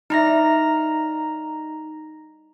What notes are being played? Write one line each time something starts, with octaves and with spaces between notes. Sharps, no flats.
G3 D#4 E4 A#5 A#6